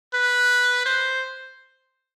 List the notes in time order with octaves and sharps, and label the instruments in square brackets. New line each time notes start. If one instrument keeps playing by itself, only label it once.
[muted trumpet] B4
C5